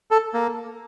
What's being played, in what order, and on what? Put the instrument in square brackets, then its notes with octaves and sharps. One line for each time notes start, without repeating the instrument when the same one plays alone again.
[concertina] A4
A#3